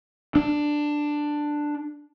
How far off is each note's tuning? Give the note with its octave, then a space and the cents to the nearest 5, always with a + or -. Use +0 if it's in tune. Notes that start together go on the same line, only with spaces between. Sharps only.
D4 +10